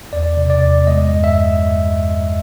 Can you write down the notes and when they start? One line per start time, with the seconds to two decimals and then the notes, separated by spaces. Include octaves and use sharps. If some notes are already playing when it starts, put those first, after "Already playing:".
0.13 E2 D5
0.37 C3
0.50 D5
0.63 E2
0.87 G#3 D#5
1.11 G2
1.24 E5